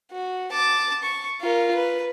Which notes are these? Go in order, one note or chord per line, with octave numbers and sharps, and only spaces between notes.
F#4
A5 D6
C#6
F4 A#4
B4